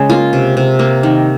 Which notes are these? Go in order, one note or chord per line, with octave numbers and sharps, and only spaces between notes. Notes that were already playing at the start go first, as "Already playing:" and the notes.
Already playing: C#3 G#3 C#4
A#3 F4
C3
C3
A#3
D#3